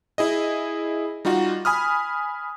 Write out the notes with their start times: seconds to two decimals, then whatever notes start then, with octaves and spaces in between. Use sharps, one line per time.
0.18 E4 G#4 D#5
1.25 G3 D#4 F4 F#4
1.65 G#5 B5 D#6 F6